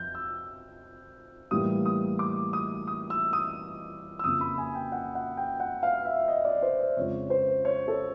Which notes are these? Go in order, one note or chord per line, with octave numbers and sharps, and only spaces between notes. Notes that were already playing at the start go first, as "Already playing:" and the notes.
Already playing: F2 F3 G6
E6
A2 E3 G3 A#3 D#6
D#6
D6
D#6
D#6
E6
D#6
E6
F2 C#3 F3 A#3 D#6
B5
G#5
G5
F#5
F#5
G5
F#5
F5
E5
D#5
D5
C5
D5
F2 C#3 F3 G#3 C#5
C5
C#5
A4